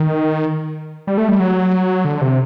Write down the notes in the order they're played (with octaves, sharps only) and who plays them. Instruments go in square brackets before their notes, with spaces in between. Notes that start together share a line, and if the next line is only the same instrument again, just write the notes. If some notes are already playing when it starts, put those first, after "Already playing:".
Already playing: [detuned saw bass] D#3
G3
A3
G3
F#3
D3
C3